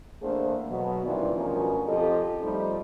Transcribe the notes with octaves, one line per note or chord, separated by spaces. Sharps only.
E2 A3 A#3 D4 G#4 C5
B2 F#3
G2 C3 D#3 E3 F4 D5
D2 B2 F3 C#4 A#4
F2 F4 G4 A4 D#5
F3 G3 A3 C4 D#4